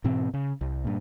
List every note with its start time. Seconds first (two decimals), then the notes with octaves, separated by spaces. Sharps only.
0.04 G#2 B2 E3 C4
0.34 C#3
0.61 C2
0.84 G2 A#2